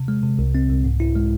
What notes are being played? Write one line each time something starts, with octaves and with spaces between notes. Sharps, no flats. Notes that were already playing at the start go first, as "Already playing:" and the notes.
Already playing: C3
G#3
C3
C2
C4
C2
G#2
E4
G#3